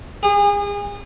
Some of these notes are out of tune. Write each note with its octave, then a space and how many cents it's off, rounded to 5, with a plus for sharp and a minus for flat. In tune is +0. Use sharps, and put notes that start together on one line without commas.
G#4 -35